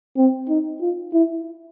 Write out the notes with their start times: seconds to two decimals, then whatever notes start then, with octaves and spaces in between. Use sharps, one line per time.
0.17 C4
0.49 D#4
0.81 F4
1.13 E4